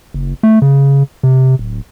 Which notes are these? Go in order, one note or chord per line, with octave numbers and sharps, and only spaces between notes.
F#1
A3
C#3
C3
D1